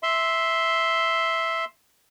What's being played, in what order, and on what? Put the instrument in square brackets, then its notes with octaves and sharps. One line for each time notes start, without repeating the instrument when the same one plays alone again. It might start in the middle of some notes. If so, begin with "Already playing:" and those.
[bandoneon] E5 C6